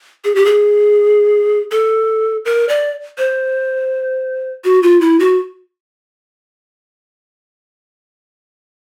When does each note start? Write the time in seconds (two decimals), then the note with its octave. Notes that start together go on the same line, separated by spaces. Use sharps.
0.24 G#4
0.35 G4
0.45 G#4
1.71 A4
2.45 A#4
2.69 D5
3.18 C5
4.64 F#4
4.83 F4
5.01 E4
5.20 F#4